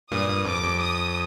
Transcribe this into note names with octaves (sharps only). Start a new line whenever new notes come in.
G2 A#2 D#6
G2
F2 D6
F2
D#6